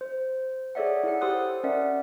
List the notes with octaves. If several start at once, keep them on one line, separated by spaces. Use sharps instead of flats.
C5
G#4 A4 C#5 D5 E5 F#5
E4 A4 F#5
G4 C5 C6 D#6 E6 F#6
C#4 A#4 D5 E5 F#5